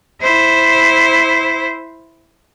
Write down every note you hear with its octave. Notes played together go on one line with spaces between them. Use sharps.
E4 C5